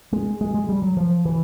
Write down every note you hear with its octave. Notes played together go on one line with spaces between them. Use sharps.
G#3
G#3
G#3
G3
F#3
F3
E3